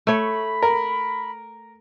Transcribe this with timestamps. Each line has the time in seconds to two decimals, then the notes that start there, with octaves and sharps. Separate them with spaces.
0.07 A3 C#5 B5
0.62 A#4